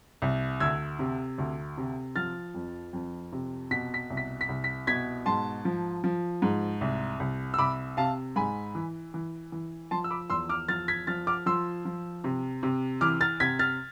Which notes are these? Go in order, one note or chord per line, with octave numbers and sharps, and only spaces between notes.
C2
D2 E6 G#6
C3
D2
C3
F3 F6 A6
F2
F2
C3
B2 B6
B6
C2
B6
B6
C2
B6
B2 G#6 B6
G#2 A5 C6
F3
F3
G#2
C2
C2
E6
C2 B5 D6
C3 F5 A5
G#2 G#5 B5
E3
E3
E3
F3 A5 C6
E6
B5 D6
E2 C6 E6
D6 F6
F3 F6 A6
G#6 B6
F3 F6 A6
D6 F6
F3 C6 E6
F3
C3
C3
E3 D6 F6
F6 A6
C3 G#6 B6
F6 A6